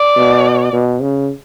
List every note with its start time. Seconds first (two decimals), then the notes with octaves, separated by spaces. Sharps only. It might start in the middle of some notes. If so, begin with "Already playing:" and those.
Already playing: D5
0.17 B2
0.73 B2
1.01 C#3